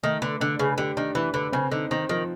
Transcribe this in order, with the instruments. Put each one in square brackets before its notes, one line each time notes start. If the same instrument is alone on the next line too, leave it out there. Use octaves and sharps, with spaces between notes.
[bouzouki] D#3 [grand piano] A3
[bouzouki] D3 [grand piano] B4
[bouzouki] D3 [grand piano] D4
[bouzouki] C#3 [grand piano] B4
[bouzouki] D3 [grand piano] G4
[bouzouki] D#3 [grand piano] D4
[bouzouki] E3 [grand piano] B4
[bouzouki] D3 [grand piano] B4
[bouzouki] C#3 [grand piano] C4
[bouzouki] D3 [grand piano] D#4
[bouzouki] D#3 [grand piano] C4
[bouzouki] D#3 [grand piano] F3